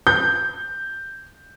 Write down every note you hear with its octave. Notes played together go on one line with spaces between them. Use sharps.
G6